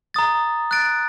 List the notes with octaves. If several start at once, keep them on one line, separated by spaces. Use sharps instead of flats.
A#5 D#6 A6
F#6 A6 D7